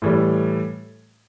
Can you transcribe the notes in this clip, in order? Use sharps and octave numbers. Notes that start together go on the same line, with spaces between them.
A2 E3 G3